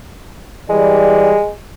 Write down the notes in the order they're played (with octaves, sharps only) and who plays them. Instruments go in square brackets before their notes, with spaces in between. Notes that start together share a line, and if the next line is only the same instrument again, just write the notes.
[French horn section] E3 G3 D5 [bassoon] G#3